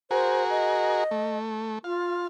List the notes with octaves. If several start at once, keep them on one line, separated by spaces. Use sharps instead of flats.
F#4 G#4 A#4 C5
D#5
A3
F4 F5